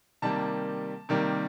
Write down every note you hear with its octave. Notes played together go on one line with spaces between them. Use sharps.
C3 D#3 G3 A#3 A5
C3 D#3 G3 A#3